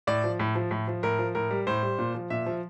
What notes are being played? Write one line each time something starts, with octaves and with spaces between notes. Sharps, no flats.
A2 D5
F3
A2
F3
A2
F3
A2 A#4
F3
A2 A#4
G3
A2 C5
G3
A#2
F3
A#2 E5
F3